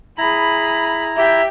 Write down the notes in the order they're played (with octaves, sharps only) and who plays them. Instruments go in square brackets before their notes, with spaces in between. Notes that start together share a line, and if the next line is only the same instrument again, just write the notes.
[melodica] E4 A#5 [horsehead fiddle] G#4 B5
[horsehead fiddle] G4 G5 [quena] E5